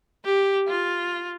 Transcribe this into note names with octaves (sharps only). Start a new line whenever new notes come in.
G4
F4